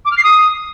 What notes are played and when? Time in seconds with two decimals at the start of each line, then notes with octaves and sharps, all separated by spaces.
0.05 D6
0.11 F6
0.17 C7
0.23 D#6